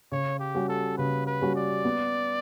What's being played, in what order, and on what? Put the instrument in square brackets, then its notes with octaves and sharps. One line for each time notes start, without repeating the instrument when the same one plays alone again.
[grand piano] C#3 [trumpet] C#5
[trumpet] G4
[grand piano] G3 C#4 F#4
[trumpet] A4
[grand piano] C#3 [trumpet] B4
[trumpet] B4
[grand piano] G3 C#4 F#4
[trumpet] D5
[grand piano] B3